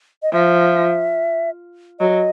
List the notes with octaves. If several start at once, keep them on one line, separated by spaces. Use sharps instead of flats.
D#5
F3 E5
F#3 D#5